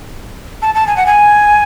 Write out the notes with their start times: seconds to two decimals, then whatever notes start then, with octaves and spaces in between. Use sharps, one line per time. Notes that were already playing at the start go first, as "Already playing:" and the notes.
0.62 A5
0.75 A5
0.87 G#5
0.97 F#5
1.06 G#5